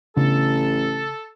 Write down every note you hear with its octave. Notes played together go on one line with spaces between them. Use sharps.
A1 C#3 B3 D4 A4